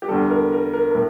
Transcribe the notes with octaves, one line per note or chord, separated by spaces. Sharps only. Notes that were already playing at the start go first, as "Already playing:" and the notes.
G4
E2 D3 G3 A4
A4
A#4
A#4
A#4
A#4
A2